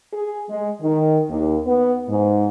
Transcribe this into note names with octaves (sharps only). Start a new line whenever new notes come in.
G#4
G#3
D#3
D#2
B3
G#2